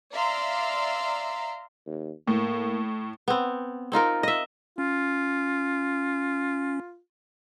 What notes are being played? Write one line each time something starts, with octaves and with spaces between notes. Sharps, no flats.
D5 E5 F5 A#5 C6
D#2
A2 A#3
B3 C4
C4 D#4 F4 A#4
D#5 E5
C#4 F4